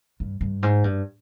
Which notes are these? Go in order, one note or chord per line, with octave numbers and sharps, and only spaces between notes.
G2
G2
G#2
G2